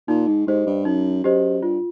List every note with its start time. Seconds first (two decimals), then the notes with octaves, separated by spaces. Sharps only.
0.08 A#2 D#4
0.27 G#2
0.47 G#2 G4 C5 D#5
0.67 G2
0.85 F#2 D#4
1.24 F#2 G4 C5 D#5
1.62 G2 F4